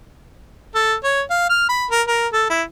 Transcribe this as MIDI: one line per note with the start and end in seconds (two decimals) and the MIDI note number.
0.75 0.95 69
1.04 1.22 73
1.30 1.48 77
1.50 1.65 89
1.69 1.85 83
1.91 2.02 70
2.08 2.28 70
2.33 2.47 69
2.50 2.63 64